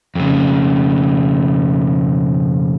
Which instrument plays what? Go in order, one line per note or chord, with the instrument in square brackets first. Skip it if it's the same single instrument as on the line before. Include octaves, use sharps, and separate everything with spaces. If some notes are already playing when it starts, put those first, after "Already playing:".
[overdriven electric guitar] F2 C#3